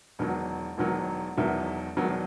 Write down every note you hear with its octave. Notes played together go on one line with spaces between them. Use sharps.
E1 E2 D#3 F#3
E1 E2 D#3 F#3
E1 E2 D#3 F#3 E5
E1 E2 D#3 F#3